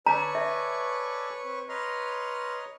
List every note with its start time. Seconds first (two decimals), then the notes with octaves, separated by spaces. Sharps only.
0.06 A4 B4 C#5 D5 G#5 A#5 C#6
0.35 E5
1.44 C4
1.69 B4 C#5 D#5 A#5 C6 F6